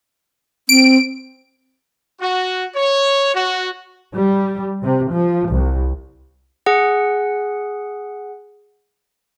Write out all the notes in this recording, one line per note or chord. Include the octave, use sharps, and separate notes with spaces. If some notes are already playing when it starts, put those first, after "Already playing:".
C4 D7
F#4
C#5
F#4
G3
C3
F3
C2
G#4 F#5